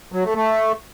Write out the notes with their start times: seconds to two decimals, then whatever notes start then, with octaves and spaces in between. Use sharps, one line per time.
0.12 F#3
0.24 A3
0.35 A3